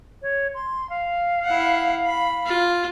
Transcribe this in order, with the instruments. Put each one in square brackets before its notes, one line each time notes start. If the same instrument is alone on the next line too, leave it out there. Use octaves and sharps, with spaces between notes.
[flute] C#5
C6
F5
[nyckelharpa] E4 F#5
B5
F4